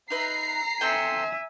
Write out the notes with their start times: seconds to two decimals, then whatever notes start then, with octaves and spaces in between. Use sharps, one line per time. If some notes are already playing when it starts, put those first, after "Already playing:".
0.10 D#4 B4 E5 A#5 C7
0.81 C4 A4 E5 G5 G#5